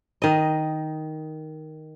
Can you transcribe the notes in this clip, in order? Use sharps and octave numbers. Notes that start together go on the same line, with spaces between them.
D#3 D#5